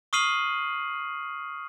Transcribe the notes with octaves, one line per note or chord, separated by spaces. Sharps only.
C#6 D#6 F6 C7 D#7 F#7